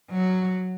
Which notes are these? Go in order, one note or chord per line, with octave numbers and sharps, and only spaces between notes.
F#3